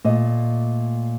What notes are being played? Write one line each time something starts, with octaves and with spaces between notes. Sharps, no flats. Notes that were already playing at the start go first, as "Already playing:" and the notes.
A#2 A3 D#5